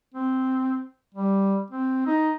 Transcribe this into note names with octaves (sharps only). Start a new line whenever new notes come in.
C4
G3
C4
D#4